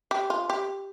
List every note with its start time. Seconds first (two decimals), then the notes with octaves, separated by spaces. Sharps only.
0.11 G4
0.30 F4
0.50 G4